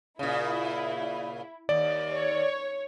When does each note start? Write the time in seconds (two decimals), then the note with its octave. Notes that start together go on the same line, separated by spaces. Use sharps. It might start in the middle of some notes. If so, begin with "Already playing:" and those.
0.19 A#2 C#3 E4
1.69 D#2 D5
2.12 C#5